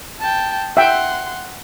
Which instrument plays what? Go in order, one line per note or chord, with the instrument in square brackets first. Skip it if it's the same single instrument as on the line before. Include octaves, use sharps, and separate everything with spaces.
[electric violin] G5 A5
[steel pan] E5 G5 [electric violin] F#5 C6